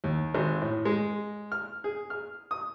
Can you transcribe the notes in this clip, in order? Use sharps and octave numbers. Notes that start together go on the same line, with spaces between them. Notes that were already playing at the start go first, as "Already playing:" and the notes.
D#2
G#1
A2
G#3
F6
G#4
F6
D#6